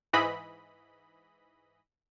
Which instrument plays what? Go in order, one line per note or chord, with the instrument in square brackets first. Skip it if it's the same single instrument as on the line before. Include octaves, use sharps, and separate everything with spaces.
[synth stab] G#2 E3 D#5 B5